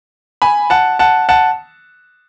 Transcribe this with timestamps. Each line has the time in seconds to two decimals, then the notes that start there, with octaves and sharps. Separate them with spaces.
0.42 G#5 B5
0.70 F#5 A5
0.99 F#5 A5
1.29 F#5 A5